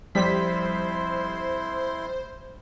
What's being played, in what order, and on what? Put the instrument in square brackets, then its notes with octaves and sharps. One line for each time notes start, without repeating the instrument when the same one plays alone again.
[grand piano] F2 [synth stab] G3 B6 [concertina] E4 C6 [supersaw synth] C5